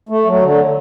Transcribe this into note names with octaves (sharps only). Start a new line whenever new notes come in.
A3
F#3
D3